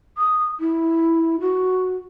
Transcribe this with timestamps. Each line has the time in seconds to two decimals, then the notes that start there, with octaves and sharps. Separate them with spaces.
0.18 D#6
0.60 E4
1.40 F#4